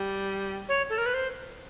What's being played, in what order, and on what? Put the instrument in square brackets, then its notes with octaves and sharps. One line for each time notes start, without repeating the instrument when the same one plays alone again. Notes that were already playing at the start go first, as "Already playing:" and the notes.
Already playing: [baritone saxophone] G3
[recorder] C#5
A4
A#4
B4
C5